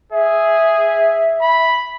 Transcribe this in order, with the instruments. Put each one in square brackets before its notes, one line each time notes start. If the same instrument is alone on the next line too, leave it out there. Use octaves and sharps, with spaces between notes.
[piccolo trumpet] G#4 [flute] E5
[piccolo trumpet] B5